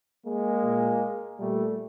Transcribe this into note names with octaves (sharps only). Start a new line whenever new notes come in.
G#3 A#3
A#2
A#2 G3 A3